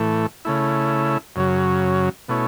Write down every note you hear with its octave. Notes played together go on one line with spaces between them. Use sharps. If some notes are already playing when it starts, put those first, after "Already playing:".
Already playing: A2 E3 A3
C#3 A3 E4
F#2 C#3 F#3
B2 A3 C#4 E4